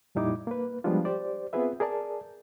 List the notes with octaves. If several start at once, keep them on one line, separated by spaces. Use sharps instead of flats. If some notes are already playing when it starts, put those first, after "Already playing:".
F2 A#2 G3 D#4 E4 D6
A#3 B4
F3 G3 G#3 B3 D4 F4
G4 C5 D5
B3 C4 F4 G#4 B4 E5
G#4 A#4 D5 A5